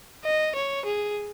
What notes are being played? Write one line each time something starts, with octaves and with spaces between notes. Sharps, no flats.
D#5
C#5
G#4